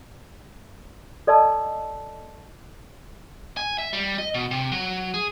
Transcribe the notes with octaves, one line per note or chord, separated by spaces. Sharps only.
A4 D5 D#5 A5 E6
G#5
E5
G3
D#5
B2
C3
F#3
G#4